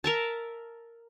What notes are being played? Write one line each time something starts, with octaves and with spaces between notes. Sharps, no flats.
A#4 E5 A5